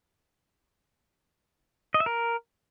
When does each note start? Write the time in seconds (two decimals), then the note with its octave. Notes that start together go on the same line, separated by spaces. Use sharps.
1.94 D#5
2.00 E5
2.06 A#4